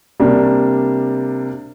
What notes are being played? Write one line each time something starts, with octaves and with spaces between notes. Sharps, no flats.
C3 G3 A#3 D4